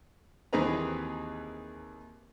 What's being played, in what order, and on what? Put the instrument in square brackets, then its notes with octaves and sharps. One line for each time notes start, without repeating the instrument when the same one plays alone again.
[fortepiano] D#2 E3 C4 G#4 B4 A#5